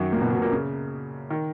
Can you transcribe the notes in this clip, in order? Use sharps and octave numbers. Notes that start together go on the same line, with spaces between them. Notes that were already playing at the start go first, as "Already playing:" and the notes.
Already playing: F#2 D#3 F#3
A#2 A#3
B2 B3
B2 B3
A#2 A#3
C#3
D#3